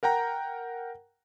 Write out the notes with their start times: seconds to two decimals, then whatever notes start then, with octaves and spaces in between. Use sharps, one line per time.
0.03 A#4 F#5 G5 A#5